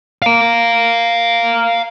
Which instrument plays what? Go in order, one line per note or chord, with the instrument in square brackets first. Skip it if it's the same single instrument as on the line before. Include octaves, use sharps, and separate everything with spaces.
[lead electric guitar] F5 A#5